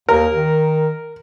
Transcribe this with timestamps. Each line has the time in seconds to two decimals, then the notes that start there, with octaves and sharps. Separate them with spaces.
0.09 D#2 A#4
0.34 D#3